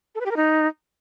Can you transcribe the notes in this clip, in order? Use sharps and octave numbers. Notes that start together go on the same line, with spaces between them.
A4
B4
G4
A#4
D#4